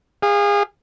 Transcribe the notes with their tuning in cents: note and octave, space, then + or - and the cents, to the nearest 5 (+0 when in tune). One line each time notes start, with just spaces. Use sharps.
G#4 -30 F5 +0